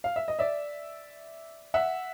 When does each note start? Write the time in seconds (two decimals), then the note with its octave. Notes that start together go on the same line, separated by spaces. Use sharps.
0.04 F5
0.16 E5
0.28 D#5
0.39 D5 E5
1.74 E5 F#5